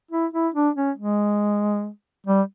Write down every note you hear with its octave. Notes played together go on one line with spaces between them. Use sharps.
E4
E4
D4
C#4
G#3
G3